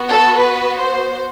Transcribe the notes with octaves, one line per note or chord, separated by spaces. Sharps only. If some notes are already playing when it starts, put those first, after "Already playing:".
Already playing: B3 F#4
A4
B4
C5